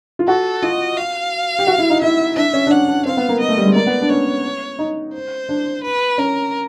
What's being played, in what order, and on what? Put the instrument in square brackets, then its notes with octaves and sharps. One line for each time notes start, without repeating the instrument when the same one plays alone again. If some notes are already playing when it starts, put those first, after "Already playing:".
[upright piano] F4
[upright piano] F#4 [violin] A4
[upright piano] F4 [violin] D#5
[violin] F5
[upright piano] G4
F#4
E4
D#4
[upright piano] E4 [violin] E5
[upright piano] D4 [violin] E5
[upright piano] C#4
D4
[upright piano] C#4 [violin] F#5
[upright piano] D4
[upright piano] C4 [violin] F5
[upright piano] B3
A#3
[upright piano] A#3 [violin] D#5
[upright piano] A3
G3
G#3
[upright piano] A#3 [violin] D5
[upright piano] B3
D4
[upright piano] C#4 [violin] C#5
[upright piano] D#4
[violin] C5
[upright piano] D4
[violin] B4
[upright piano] C#4 [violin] A#4